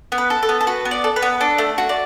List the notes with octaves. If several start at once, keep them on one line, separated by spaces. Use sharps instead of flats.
B3
B4
A4
A4
B3
A4
F#4 B4
B3
D5
A4
B4
B3
D4 A4
A3
F#4
D5